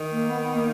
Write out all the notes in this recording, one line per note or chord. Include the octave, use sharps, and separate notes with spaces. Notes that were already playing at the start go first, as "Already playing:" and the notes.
Already playing: D#3
A#3
B3
B3
A#3